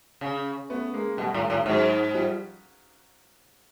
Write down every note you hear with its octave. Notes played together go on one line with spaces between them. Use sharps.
C#3
A3 B3
G#3 A#3
B2 G3 A3
A2
A2
G#2 F#3 G#3
F3 G3